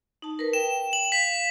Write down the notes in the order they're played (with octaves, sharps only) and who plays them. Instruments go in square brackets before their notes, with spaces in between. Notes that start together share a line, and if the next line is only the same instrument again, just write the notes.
[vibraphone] D#4 A5
A#4 B4
[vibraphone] G5 [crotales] E7
[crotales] F#7
[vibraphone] F5 [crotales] B6